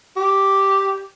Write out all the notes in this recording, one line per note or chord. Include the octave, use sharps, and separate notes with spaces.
G4